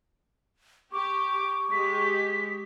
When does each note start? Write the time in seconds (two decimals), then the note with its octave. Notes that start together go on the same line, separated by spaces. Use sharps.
0.93 G4 C#6 D6
1.72 G#3 G4 B6